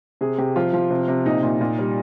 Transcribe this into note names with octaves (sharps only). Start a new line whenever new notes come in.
C3 G#4
C3 G4
F3 F4
F3
C3
C3
A#2 D#4
A#2
A#2
G3